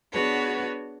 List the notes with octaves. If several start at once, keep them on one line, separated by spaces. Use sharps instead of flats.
B3 D4 F#4 G#4 B4 C#5